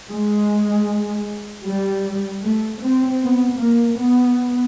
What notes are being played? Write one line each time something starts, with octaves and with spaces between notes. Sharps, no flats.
G#3
G3
A3
C4
B3
A#3
B3